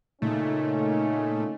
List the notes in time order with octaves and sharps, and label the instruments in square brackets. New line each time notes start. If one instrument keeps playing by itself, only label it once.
[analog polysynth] A#2 C#3 A3 [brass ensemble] C#4 D#4